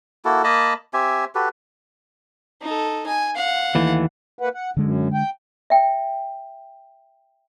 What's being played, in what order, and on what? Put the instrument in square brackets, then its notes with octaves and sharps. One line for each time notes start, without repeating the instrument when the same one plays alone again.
[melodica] A#3 E4 F#4 A4
A#3 D#5 A5 B5
C4 G4 E5 G#5
F#4 G4 A4 B4
[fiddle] D#4 A4
G#5
F5 F#5
[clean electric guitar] D#2 E3 A3
[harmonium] A#3 B4 F#5
F#5
[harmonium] F#2 [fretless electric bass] D3 G#3
[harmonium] G5
[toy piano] E5 G5